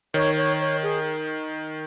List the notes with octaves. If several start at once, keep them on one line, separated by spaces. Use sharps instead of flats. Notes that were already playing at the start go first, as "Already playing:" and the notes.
D#3 C#5
C#5
C#5
G#4